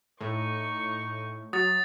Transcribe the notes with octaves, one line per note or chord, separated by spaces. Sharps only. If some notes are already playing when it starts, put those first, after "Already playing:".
A2 D#4 C#6
F#3 D#6 A6